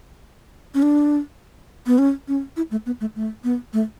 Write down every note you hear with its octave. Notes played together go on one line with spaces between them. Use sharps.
C#4
D4
B3
C#4
C#4
E4
A3
B3
A3
A3
B3
A3